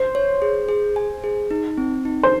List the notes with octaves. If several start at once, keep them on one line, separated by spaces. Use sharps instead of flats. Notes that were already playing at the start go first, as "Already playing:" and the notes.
Already playing: C5
C#5
G#4
G#4
G#5
G#4
D#4
C4
D#4
C5